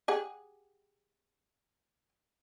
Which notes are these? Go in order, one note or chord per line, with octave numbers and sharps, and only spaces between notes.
G4 G#4 F#5